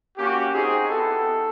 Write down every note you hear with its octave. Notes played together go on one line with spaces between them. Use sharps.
A#3 C#4 F#4 G4
C4 D#4 F#4 G#4
B3 E4 G4 A4